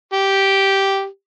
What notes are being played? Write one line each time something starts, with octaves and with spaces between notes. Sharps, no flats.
G4